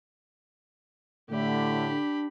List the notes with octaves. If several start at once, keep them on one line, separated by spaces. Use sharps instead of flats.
A2 D3 A3 G4 B5
D4